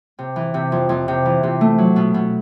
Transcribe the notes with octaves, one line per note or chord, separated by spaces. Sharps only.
C3
E3
C3
F2
F2
C3
E3
C3
A3
F#3
B2
B2